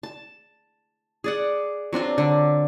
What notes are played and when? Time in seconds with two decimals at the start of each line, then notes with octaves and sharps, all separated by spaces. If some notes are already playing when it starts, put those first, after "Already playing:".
0.03 A5
1.24 G#4 D5 F#5
1.93 F#3 C4 D4 F4
2.18 D3